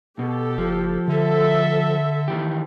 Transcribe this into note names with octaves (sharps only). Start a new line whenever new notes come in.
B2 G4 A4
F#1 F3
D3 A4 E5
D#3 E3 G4